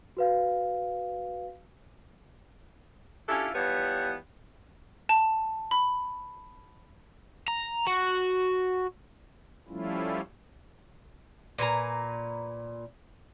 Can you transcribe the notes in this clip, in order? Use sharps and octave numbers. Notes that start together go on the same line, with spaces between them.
F#4 B4 F5
C#4 D4 E4 F4 G4 A4
E3 F3 G3 B3 B4 C#5
A5
B5
A#5
F#4
F3 G3 A3 C#4 E4 F4
A#2 B4 G#5 A#5